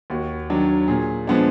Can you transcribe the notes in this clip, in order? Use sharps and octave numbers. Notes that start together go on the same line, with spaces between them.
D#2 F#4
D#3 F#3 D4
A#2 G#4
F3 G#3 B3 D4